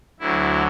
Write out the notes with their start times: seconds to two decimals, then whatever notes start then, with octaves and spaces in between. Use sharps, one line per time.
0.20 D2 D3 F#3 E4